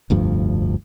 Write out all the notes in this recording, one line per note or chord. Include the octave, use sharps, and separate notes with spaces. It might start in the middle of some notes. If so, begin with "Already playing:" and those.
F1 D2 G2 F3